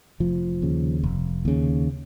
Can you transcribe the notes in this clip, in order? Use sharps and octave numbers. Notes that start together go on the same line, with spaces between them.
F1 F3
D#2 C#3
F1
D#2 C#3